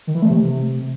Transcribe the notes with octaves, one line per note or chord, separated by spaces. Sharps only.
D#3
E3
A3
C3